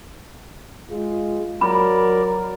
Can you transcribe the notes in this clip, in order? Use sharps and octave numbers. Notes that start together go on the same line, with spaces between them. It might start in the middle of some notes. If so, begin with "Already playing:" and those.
G#3 F4
F#3 A#4 D5 B5